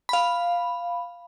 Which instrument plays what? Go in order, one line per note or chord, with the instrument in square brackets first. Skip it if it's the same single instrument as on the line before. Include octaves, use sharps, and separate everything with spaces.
[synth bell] F5 B5